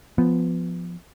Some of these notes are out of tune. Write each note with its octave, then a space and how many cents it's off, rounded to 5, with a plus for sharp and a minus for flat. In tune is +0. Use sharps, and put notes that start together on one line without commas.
F3 +0 B3 +10